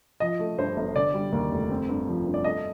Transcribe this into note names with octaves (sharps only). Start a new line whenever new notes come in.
F3 D#5
A3
G2 C5
G1
D3 D5
G3
D#2
F1
C4
G2
F3
G2
D5
A3 D#5